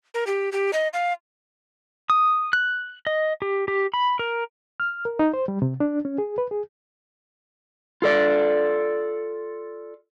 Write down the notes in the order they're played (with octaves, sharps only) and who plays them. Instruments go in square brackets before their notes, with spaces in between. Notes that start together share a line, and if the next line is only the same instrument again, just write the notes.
[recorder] A#4
G4
G4
D#5
F5
[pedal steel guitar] D#6
F#6
D#5
G4
G4
B5
A#4
[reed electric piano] F6
A#4
D#4
C5
G3
C3
D4
C#4
G#4
B4
G#4
[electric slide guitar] F4 A4 D5